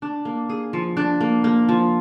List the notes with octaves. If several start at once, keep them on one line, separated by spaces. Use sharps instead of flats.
D4
A#3
G#4
F3
D4
A#3
A#3
F3